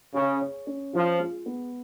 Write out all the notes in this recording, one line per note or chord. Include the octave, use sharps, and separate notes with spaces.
C#3 G#4
C#5
C#4
F3 F4
G#3
B3